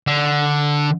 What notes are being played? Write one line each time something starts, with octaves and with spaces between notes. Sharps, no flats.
D3